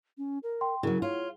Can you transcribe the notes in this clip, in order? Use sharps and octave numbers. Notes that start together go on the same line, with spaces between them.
C#4
A#4
G5 C6
C#3 F#3 E4 A#4
F4 C#5